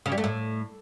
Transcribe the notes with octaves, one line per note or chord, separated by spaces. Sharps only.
C#3
G3
A3
A2